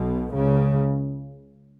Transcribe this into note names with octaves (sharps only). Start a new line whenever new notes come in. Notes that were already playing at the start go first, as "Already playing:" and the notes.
Already playing: B1 B2
C#2 C#3